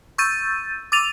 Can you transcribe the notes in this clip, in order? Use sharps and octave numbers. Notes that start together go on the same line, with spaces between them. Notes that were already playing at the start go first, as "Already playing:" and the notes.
C#6 E6 G6 A6 D#7
D6 E6 A6 D#7 F7